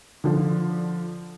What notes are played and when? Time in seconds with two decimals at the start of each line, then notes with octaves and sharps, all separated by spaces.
0.24 D3 F3